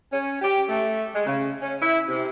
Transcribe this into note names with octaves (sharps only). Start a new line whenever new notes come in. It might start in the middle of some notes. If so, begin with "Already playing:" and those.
C#4
G4
A3
G#3
C#3
C#4
E4
C3